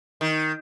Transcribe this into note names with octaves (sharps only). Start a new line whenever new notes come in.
D#3